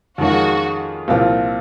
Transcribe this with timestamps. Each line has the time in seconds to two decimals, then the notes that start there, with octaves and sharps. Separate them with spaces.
0.18 F2 D#3 G#3 C#4 F4 F#4
1.08 C2 A#2 F3 C4 F4